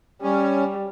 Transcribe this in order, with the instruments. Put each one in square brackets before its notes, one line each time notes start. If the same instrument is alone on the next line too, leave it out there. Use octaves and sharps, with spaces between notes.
[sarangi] G3 [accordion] C#4